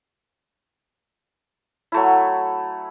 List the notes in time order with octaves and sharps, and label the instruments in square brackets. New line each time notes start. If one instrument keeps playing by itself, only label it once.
[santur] F#3 A3 E4